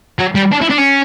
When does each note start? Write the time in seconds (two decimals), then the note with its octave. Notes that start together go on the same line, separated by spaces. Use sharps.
0.19 F#3
0.35 G3
0.52 D4
0.61 E4
0.70 D4
0.78 C#4